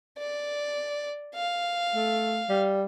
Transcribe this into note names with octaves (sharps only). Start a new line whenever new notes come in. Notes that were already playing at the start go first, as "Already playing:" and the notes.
D5
F5
A3
G3